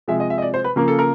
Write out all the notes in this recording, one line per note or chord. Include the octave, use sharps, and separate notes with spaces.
C3 F3 G#3 E5
D#5
E5
D#5
D5
C5
B4
C#3 F3 A#3 A#4
A4
A#4